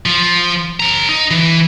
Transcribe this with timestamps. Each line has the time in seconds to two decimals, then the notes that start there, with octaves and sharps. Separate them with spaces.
0.06 F3
0.80 A4 A#5
1.09 D#4
1.31 E3